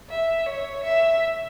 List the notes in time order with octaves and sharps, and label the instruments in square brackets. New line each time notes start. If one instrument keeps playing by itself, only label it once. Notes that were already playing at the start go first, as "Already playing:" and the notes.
[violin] E5
C#5
E5